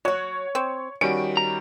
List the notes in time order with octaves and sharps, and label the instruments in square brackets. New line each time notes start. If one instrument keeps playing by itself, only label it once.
[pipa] F#3 F#4 [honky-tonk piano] C#5
[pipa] C4
[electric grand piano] D#3 G3 F#4 [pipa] C#4 [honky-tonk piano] D7
[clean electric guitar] A#5